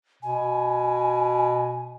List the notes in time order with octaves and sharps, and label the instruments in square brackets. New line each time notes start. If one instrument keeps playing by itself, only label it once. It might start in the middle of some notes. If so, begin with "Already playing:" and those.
[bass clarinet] B2 [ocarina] G#5